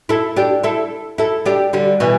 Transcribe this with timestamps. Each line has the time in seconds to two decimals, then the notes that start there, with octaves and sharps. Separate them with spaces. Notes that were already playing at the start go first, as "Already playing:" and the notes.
0.09 E4 A4
0.36 D4 G4
0.63 E4 A4
1.18 E4 A4
1.46 D4 G4
1.73 D3 G3
2.00 B2 E3